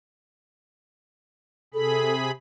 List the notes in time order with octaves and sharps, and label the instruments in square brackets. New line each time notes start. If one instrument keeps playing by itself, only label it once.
[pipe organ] C3 G#4 B5 [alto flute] A4